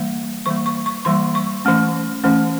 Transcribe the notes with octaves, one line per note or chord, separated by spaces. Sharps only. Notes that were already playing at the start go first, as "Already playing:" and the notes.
Already playing: E3 G3 A#3
E3 G3 A#3 C#6
C#6
C#6
E3 G3 A#3 C6
C#6
E3 A3 C#4
E3 A3 C#4